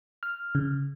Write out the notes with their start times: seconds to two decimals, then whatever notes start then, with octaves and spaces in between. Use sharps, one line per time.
0.23 F6
0.55 C#3